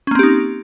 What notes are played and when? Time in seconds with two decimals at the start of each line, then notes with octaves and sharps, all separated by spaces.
0.07 C#4
0.11 A#3
0.15 C4
0.19 G4
0.23 D#4